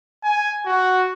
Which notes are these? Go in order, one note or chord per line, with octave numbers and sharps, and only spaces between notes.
G#5
F#4